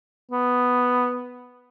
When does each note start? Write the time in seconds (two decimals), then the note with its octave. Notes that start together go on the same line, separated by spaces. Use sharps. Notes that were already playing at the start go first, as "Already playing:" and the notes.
0.31 B3